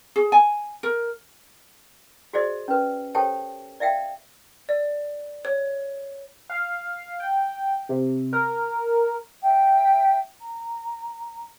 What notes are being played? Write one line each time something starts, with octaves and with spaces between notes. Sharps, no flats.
G#4
G#5
A#4
F#4 G#4 C5 D5 D#5
C#4 B4
G4 A4 C5 C#5 G5 A5
D5 E5 F5 G5
D5
C#5
F5
G5
C3
A#4
E5 G5
A#5